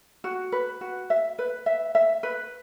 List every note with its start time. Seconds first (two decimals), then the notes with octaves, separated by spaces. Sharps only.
0.24 F#4
0.52 B4
0.81 F#4
1.10 E5
1.39 B4
1.66 E5
1.95 E5
2.23 B4